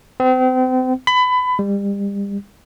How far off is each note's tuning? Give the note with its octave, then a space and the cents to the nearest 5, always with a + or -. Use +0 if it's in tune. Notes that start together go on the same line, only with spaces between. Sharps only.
C4 -35
B5 +25
G3 +35